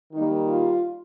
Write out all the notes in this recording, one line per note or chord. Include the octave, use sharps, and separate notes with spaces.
D#3 G3 A#3 D#4
F4